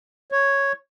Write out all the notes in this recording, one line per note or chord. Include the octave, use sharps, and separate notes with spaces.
C#5